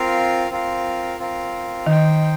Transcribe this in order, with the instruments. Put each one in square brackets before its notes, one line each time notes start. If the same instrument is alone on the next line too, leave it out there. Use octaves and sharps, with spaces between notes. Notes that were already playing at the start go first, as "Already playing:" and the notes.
Already playing: [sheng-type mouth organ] C4 F4 A#4 F5
C4 F4 A#4 F5
C4 F4 A#4 F5
[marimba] D#3 [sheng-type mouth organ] D#4 C5 G5